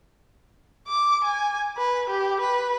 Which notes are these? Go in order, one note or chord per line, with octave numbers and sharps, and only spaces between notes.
D6
G#5
B4
G4
B4